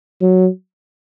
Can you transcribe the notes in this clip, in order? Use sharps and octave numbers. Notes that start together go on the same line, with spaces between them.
F#3